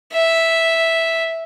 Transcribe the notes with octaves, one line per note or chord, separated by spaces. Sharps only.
E5